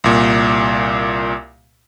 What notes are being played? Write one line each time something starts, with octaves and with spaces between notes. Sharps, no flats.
C2 A#2